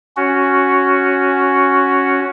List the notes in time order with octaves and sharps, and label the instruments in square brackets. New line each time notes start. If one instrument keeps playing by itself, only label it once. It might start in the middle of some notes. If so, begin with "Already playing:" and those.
[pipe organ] C#4 F#4